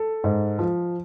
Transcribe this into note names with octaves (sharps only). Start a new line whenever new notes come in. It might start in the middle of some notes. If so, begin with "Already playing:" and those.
Already playing: A4
G#2
F3